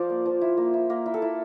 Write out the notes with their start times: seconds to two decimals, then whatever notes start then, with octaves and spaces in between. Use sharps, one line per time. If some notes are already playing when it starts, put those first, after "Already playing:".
Already playing: F3 C5 D5
0.10 A#3
0.26 F3
0.41 E4
0.57 A#3
0.74 E4
0.90 A#3 A#4
1.06 E4
1.14 A4
1.22 E4